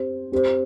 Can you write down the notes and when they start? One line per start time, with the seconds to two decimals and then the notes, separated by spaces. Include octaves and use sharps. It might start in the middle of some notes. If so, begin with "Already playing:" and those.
Already playing: C4 G4 C5
0.32 C4 G4 C5